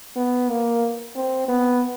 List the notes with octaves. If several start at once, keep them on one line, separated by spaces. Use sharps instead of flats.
B3
A#3
C4
B3